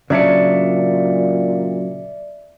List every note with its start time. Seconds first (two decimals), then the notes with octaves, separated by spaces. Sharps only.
0.10 A#2 C#3 F#3 D4 D5 E5 C#7